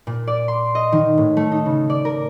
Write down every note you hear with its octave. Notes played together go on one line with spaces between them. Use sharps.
A#2
D5
C6
D#5
D#3
A2
A3
D#4
C#3
D5
A#4